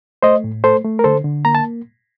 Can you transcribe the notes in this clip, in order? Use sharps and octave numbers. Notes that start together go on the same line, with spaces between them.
A3 C5 D#5
A2
A3 A4 C5
A3
A#4
D3 A4 C5
D3
A#3 A#5
A5